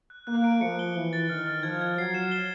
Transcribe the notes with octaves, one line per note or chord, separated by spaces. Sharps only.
F#6
A#3 F#6
D7
F3 C#7
G7
E3 G7
A6
D#3 F6
F6
F3 G#6
G#6
F#3 C7
E7
G7